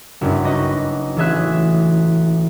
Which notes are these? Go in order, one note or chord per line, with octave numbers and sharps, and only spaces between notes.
F#1 C2 G2
D#4 F#4 B4 D#5 D6
A1 E3 A3 G#4 E5 F#6